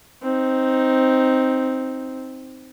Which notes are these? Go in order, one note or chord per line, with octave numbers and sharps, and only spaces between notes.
C4 D#4